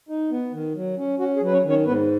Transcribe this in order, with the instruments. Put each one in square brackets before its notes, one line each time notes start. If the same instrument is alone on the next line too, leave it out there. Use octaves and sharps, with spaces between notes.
[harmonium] D#4
B3
D#3
F#3
C#4
C#4 F#4
G#4
F#3 B4
C#4 C#5
D#3
C#4 C#5
G#2 B3 B4